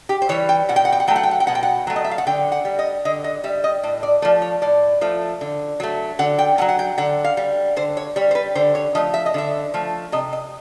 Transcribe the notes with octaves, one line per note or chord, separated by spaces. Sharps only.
G4
C5
E3 G3 C#5
G5
B2 F#5
G5
F#5
G5
F#5
F#3 A3 G5
F#5
G5
F#5
G5
B2 F#5
G5
F#5
F#3 A3
D#5
E5
F5
F#5
D3 G5
F#5
G3
D#5
D3 D#5
D#5
G3 E5
D#5
A2 D5
D5
F3 A3 D5
C#5
A2 D5
F3 A3
D3
F#3 A3
D3 F#5
G5
F#3 A3 F#5
F#5
G5
D3 F#5
F5
G3
D3 C5
C#5
G3 C#5
C5
B4
D3 C5
C#5
F3 A3 D#5
E5
D#5
D3 E5
F3 A3
C3 D#5
D#5